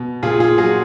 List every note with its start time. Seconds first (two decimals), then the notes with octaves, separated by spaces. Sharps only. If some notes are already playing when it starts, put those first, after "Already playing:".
Already playing: B2
0.23 A#2 F4 G#4
0.40 F4 G#4
0.58 F#3 F4 G#4